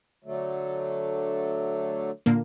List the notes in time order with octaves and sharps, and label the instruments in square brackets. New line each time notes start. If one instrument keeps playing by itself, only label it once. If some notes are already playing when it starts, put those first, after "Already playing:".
[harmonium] D3 F#3 A3
[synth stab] A#2 D3 A#3